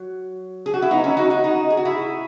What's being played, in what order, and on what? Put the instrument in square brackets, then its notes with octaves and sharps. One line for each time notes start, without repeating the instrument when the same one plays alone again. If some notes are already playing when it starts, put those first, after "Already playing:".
Already playing: [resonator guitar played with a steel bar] F#3
G#4
F#4
E4
B3 D#4
C#4 E4
D#4 F#4
D#4 F#4
D#4 F#4
G#4
F#4
E4 G#4